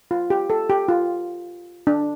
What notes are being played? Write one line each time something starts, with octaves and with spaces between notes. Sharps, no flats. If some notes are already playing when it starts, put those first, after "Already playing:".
F4
G4
A4
G4
F4
D4